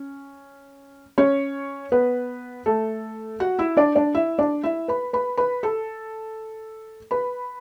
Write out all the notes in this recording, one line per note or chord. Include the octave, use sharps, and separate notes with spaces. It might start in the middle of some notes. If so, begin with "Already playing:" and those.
Already playing: C#4
C#4 C#5
B3 B4
A3 A4
F#4 F#5
E4 E5
D4 D5
D4 D5
E4 E5
D4 D5
E4 E5
B4 B5
B4 B5
B4 B5
A4 A5
B4 B5